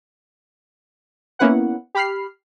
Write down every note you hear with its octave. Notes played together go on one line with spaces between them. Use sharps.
A#3 B3 C#4 E4 B4 F#5
G4 B5 F6 C7